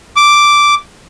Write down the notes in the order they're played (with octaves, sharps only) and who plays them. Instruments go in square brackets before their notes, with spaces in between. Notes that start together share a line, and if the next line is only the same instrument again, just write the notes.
[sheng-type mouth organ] D6